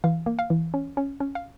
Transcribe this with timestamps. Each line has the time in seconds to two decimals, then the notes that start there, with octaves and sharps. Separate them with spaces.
0.04 E3 F5
0.26 A#3
0.39 F5
0.50 E3
0.74 C#4
0.97 C#4
1.20 C#4
1.35 F5